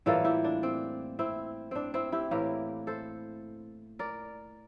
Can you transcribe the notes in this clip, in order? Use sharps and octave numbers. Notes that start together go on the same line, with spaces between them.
A2 E3 G3 A#3 F4 A4
E4 G4
D4
C4
C4 E4
C4 D4
C4 E4
E4 G4
A2 E3 A#3 G4 A#4
A4 C5
A#4 D5